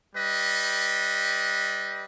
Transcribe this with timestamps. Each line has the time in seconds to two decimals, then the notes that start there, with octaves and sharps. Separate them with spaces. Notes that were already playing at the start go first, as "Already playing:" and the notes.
0.16 G3 B4 D#5